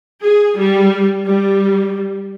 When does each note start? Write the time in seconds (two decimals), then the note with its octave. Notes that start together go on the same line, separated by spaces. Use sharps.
0.25 G#4
0.59 G3
1.27 G3